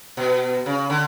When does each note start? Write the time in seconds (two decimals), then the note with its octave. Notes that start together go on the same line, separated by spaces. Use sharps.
0.17 B2
0.66 C#3
0.90 D3